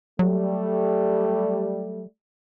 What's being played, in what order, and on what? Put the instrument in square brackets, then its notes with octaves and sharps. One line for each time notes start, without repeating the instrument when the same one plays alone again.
[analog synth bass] F#3 [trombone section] G3 A3